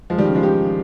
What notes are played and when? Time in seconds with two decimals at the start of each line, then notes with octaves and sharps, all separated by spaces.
0.10 F3 G#3
0.18 D#3 G3
0.27 C#3
0.35 F3 G#3
0.43 D#4 G4